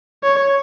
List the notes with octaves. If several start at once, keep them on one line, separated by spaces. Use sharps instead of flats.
C#5